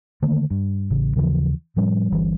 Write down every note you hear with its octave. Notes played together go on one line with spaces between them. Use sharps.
D3 D#3 A3 A#3
G2
A1 C#3
D#2 C#3 E3 F3
A2 F3 G3 C#4
G1 G2 E3